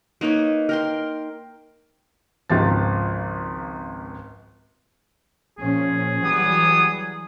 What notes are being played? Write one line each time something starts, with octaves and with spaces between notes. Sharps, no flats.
A#3 D#4 B4 C#5
A#4 G5 C6
G#1 C#2 F3 A6
A#2 F3 C#4 G#4
E3 F#3 G3 B3 G4 D#6